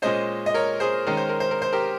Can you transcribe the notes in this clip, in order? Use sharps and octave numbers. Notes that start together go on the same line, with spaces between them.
A#2 G#3 C#4 C5 D#5
D#5
A#4 C#5
G#4 C5
D#3 G#3 C#4 A#4
C5
A#4
C5
A#4
C5
G4 A#4